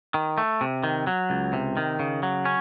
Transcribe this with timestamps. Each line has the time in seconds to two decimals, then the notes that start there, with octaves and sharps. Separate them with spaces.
0.14 D#3
0.38 A3
0.61 C3
0.83 D#3
1.07 F#3
1.30 C#2
1.53 C3
1.77 D#3
1.99 C#3
2.23 F#3
2.45 C#4